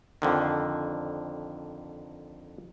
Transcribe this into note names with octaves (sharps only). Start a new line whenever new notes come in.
F2 D3 D#3